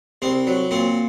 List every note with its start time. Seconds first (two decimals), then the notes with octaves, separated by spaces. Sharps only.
0.22 C2 C4
0.47 F#3
0.71 A#2 C4